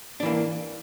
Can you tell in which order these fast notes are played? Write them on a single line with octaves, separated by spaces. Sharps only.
D4 E3 A#3